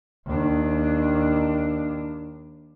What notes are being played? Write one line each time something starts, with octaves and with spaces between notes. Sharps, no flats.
D#2 D4